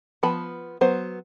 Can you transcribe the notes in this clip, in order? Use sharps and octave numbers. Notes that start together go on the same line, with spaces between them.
F3 B3 A5 B5
F#3 B3 C5